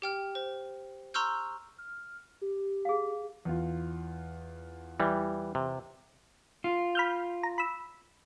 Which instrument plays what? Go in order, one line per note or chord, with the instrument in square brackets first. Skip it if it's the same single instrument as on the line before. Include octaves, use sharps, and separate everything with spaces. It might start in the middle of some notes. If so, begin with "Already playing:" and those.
[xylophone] G4 G5 F6
C5
A#5 C6 C#6 E6 F6 G6
[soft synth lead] F6
G4
[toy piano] G#4 F5
[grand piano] E2 F4
[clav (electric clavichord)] E3 G3
C3
[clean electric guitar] F4
[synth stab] B5 F6 G6
A#5
B5 E6